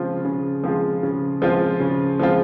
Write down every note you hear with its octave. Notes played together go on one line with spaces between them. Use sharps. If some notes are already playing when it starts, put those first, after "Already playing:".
Already playing: C#3 F3 G#3 C4 F4
C#3
F3 G#3 C4 F4
C#3
F3 G#3 C4 F4
C#3
F3 G#3 C4 F4